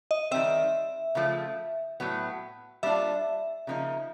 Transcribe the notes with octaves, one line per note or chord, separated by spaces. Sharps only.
D#5
D#3 G3 C4 E5
C#3 F3 A3
A2 F#3 B3
G3 A#3 D4 F4 E5
C#3 F3 A#3 D#4